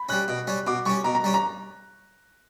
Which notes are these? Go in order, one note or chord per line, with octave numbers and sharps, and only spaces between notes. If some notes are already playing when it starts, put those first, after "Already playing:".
Already playing: B5
G3 C#4 F#6
B2
G3 C#4
B2 D6
G3 C#4 C#6
B2 A#5
A#5
G3 C#4
A#5